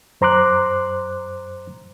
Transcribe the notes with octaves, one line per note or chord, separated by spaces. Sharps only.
F#2 C5 A#5 C6 D6 F#6